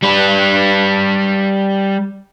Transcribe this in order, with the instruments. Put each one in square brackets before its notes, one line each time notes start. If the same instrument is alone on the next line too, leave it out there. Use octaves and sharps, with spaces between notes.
[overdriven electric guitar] G3 B4